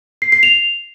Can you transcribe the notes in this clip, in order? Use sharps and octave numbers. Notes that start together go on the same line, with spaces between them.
C7
C7
F7